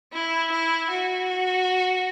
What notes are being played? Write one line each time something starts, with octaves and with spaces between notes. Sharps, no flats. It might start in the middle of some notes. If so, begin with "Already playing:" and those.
E4
E4
F#4